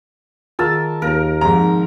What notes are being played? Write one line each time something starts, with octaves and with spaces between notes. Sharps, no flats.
D#3 F4 G#4 A#4 F#5 A5 E6
D#2 A#4 F5 A#6
G#2 F3 C4 D#4 A#5